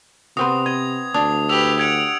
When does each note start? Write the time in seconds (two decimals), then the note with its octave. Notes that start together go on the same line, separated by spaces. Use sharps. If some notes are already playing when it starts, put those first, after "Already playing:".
0.37 C3 B3 C4 F#4 D#6
0.66 D#5 G#6
1.14 D2 D4 D#6
1.49 G4 B4 E6 F7
1.79 F#5 G#6 D7